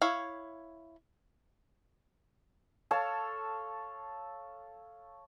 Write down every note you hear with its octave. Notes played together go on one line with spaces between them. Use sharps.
E4 C#5 F5
A4 C#5 F5 A5